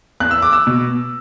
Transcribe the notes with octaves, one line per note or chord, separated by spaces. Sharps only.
E2 F#6
E6
D6
E6
B2